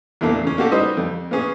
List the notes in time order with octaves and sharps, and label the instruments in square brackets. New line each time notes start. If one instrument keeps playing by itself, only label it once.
[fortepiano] E2 A#2 A3 A#3 D4
C#3 C#4
A#3 F#4 G4 A4
G3 D#4 B4 C5 D#5
F2
A#3 B3 C#4 G#4